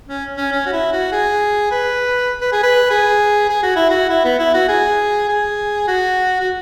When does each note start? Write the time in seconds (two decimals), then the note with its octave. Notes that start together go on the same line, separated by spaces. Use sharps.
0.08 C#4
0.37 C#4
0.52 C#4
0.66 F#4
0.72 E4
0.92 F#4
1.12 G#4
1.72 B4
2.41 B4
2.52 G#4
2.63 B4
2.90 G#4
3.50 G#4
3.63 F#4
3.76 E4
3.89 F#4
4.09 E4
4.25 B3
4.39 E4
4.54 F#4
4.69 G#4
5.29 G#4
5.88 F#4
6.40 F#4